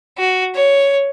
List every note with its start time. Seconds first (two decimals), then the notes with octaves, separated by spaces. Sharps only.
0.18 F#4
0.55 C#5